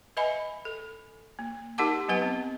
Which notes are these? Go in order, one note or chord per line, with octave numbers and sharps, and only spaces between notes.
B4 D#5 E5 G#5 B5
A4
A#3
D#4 G4 A#4 F#5 A5 D6
F#3 B3 B4 F#5
C4